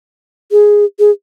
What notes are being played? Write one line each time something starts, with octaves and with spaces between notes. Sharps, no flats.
G#4
G#4